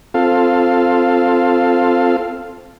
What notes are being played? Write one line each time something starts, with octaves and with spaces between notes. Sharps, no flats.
C4 F4 A4 F5